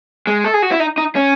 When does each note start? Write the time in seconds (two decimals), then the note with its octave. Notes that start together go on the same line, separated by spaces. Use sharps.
0.27 G#3
0.44 A4
0.54 G#4
0.62 F#4
0.71 E4
0.80 D#4
0.98 D#4
1.16 C#4